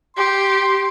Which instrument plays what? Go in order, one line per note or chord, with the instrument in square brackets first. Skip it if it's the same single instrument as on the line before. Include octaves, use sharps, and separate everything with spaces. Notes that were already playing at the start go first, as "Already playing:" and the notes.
[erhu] G4 [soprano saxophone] C6